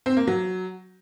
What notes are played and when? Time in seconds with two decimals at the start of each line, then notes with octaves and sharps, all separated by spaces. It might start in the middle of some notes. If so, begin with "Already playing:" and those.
0.06 C4
0.17 A#3
0.27 F#3